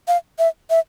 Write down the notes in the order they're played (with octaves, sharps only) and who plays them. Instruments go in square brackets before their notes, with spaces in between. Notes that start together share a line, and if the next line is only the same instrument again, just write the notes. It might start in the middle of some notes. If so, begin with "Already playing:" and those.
[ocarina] F5
E5
E5